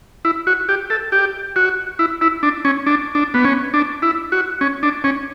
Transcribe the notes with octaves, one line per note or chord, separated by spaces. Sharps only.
E4
F#4
G4
A4
G4
F#4
E4
E4
D4
C#4
D4
D4
B3
C#4
D4
E4
F#4
C#4
D4
C#4